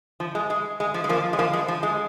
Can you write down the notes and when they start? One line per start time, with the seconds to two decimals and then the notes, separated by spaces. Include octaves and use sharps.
0.20 F3
0.35 G#3
0.50 G#3
0.80 G#3
0.94 F3
1.04 G#3
1.09 F3 A#3
1.33 G#3
1.39 F3 A#3
1.53 G#3
1.68 F3
1.83 G#3